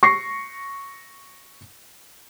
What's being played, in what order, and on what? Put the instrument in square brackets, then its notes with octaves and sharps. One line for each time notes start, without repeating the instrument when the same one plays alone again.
[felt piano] C#6 A#6 C7